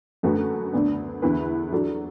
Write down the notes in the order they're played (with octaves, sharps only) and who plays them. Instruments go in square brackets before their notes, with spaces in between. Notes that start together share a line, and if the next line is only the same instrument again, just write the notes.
[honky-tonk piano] F#2 D3 A3 F#4 B4
D2 D3 B3 D4
E2 D3 B3 E4 B4
F#3 D4 A4